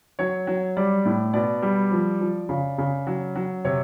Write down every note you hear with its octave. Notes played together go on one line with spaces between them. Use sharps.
F#3 C#5
F#3
G3 D5
A2
B2 D5
G3
F3
F3
C#3
C#3
F#3
F#3
C3 C#5